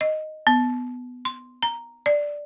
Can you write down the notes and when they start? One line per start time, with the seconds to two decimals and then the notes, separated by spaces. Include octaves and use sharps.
0.01 D#5
0.47 B3
1.25 C6
1.63 A#5
2.06 D5